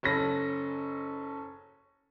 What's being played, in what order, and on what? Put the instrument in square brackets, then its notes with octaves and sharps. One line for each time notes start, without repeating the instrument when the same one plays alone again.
[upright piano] F#1 C#4 A4 B5 A#6